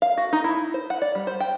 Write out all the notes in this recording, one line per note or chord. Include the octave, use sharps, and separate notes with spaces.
F5
F#4
D#4
E4
C5
F#5
D5
G3
C5
G5